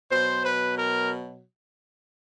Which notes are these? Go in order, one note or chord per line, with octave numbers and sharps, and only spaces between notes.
B2 F#3 C5
B4
A#4